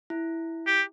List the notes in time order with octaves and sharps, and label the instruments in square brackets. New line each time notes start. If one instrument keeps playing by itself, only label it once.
[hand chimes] E4
[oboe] G4